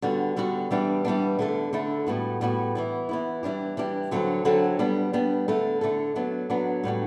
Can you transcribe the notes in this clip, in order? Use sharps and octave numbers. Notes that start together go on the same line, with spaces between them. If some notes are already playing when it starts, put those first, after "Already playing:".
D3 G3 B3 F#4
D3 G3 B3 F#4
E3 G3 B3 D4
E3 G3 B3 D4
D3 A3 E4 A4
D3 A3 E4 A4
A2 G3 B3 F#4
A2 G3 B3 F#4
E3 B3 E4
E3 B3 E4
E3 G3 D4 G4
E3 G3 D4 G4
D3 F#3 C4 E4 A4
D3 F#3 C4 E4 A4
G3 B3 D4
G3 B3 D4
D3 A3 E4 A4
D3 A3 E4 A4
F#3 B3 D4
F#3 B3 D4
A2 G3 D4 F#4